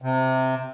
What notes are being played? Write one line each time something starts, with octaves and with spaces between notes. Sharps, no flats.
C3